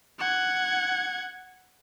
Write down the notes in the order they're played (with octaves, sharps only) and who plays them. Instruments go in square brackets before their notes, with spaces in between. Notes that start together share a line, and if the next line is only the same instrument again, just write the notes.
[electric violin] F#5 G#6